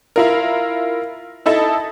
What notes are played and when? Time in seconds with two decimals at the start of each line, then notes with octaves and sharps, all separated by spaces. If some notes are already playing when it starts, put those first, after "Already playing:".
0.16 E4 F4 A#4
1.46 D#4 E4 A4 D#5 A5